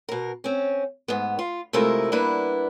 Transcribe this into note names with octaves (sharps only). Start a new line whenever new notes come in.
B2 A#4
C4 C#4
G#2 B3
F4
C3 G#3 A3 E4 F4 A#4
G3 A#3 B3 D4 E4 B4